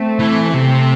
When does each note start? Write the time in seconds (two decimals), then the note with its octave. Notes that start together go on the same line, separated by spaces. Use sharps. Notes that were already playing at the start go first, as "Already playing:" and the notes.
Already playing: A3 C4
0.19 E3
0.53 C3 A3 C4